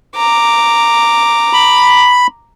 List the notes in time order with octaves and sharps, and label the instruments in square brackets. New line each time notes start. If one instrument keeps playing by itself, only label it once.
[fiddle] A#5 D6
[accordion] B5